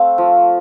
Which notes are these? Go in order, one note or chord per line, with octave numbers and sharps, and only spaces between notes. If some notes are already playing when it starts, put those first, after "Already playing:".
Already playing: A3 C4 F5
F3